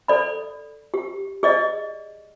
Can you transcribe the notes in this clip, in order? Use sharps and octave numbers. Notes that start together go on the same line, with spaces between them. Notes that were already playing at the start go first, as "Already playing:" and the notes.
A4 D5 B5
G4
G#4 D5 D#5